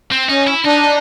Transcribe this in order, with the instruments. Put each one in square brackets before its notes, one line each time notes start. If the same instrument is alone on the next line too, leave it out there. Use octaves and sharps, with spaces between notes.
[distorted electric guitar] C4
[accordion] C#4 [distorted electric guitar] D#4
[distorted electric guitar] E4
[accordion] D4 [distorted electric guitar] D#4